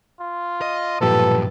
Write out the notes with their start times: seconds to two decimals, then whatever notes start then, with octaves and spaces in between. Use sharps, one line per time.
0.20 F4
0.62 D#5
1.01 B1 G2 A#2 F3 G4 A4 B4